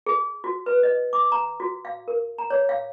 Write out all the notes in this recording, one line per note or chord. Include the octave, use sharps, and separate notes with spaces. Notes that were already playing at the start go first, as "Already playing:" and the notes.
G#4
F#4
B4
D#5
D6
A#5
F#4
F5
A#4
A#5
C#5
F5